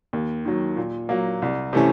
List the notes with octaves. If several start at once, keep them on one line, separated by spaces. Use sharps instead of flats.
D#2
D#3 F#3
A#2
F#3 A#3
C2
C3 E3 A3 C#4